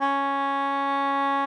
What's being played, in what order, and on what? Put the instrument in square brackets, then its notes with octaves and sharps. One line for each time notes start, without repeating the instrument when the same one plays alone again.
[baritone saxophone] C#4